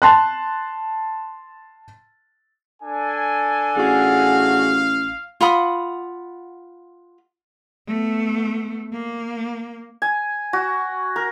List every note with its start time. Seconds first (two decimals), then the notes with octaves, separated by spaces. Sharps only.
0.02 A5 C6 F#6
2.83 D4 A4 G#5
3.76 A1 F#4 G#4 F5
5.41 F4 F#5 B5 D#6
7.88 A3 B3
8.93 A#3
10.02 G#5
10.53 F#4
11.16 A#4